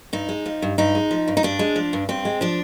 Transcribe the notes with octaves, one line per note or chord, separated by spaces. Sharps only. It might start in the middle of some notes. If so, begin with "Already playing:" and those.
G2 D#4
G#3
F3
G2
G2 D#4
G#3
F3
G2
D#4
G2 D4
G#3
F3
G2
G2 C4
G#3
F3 D4